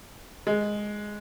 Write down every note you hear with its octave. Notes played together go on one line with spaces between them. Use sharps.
G#3